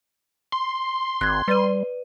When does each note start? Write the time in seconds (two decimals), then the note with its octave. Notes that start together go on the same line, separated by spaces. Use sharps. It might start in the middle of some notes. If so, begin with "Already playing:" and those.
0.52 C6
1.21 G#1 F#6 G#6
1.48 G3 B4 D5 D#7